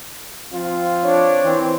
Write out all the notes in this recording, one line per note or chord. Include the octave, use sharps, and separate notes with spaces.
F3 C4 F4
D4 C#5
E3 C4